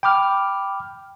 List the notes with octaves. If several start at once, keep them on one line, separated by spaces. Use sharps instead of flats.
G5 B5 D6 F6